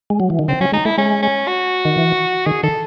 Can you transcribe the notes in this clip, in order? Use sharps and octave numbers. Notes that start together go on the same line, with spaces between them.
G#3
F#3
E3
D#3
C#3 C4
F#3 C#4
G#3 D#4
A3 E4
G#3 C#4
C#4
F#4
D#3
E3
D#3 G#4
D#3 A4